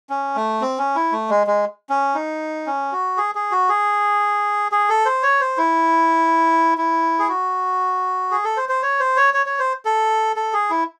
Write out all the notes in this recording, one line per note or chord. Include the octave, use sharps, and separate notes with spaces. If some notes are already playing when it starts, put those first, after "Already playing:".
C#4
A3
C4
C#4
E4
A3
G#3
G#3
C#4
D#4
C#4
F#4
G#4
G#4
F#4
G#4
G#4
A4
C5
C#5
C5
E4
E4
G#4
F#4
G#4
A4
C5
C5
C#5
C5
C#5
C#5
C#5
C5
A4
A4
G#4
E4